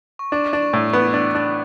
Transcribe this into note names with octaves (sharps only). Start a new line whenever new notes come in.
C#6
D4 D6
D4
C#6
A2
B3 C#6
D4
D4